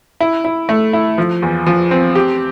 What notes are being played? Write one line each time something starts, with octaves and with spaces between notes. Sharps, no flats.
E4
E4
A3
E4
F3
E2
F3
C4
G4